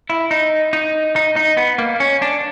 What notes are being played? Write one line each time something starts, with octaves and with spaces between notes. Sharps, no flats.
E4
D#4
D#4
D#4
D#4
B3
A#3
C#4
D4